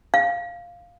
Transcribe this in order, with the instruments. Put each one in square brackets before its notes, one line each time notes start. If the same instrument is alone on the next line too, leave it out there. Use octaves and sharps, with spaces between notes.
[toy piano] F5